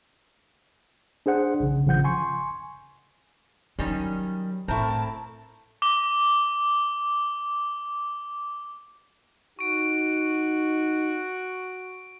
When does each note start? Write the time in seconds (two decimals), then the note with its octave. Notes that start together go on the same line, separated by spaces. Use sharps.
1.26 D4 G#4 C5 F#5
1.60 A#1 C#3
1.86 G#1 C#3 F3 F#5 G6
2.04 G#5 C6 C#6
3.79 D#3 F#3 G3 C#4
4.68 A2 A3 C4 E4 A#4 A5
5.82 D6 G7
9.59 D#4 F#4 C#6 D7